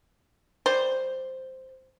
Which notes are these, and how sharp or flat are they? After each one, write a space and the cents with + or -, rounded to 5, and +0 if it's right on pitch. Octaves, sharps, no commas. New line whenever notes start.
G3 +0 C5 +0